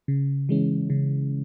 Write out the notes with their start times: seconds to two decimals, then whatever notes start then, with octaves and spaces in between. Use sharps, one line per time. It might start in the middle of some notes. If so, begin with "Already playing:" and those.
0.08 C#3
0.49 E3 G#3 C#4
0.90 C#3